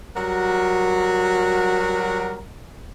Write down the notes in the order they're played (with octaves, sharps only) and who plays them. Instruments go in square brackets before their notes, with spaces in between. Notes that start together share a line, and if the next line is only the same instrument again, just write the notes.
[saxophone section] F#3 G3 F#4 A#4